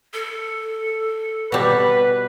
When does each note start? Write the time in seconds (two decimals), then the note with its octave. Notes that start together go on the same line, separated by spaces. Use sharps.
0.14 A4
1.52 B2 G3 B4